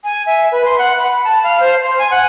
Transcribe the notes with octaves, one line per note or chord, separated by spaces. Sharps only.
G#5
E5
B4
C6
F#5
B5
A5
F5
C5
C6
G#5
F#5